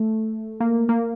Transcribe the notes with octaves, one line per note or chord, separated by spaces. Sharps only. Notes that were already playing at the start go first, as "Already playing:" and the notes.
Already playing: A3
A#3
A#3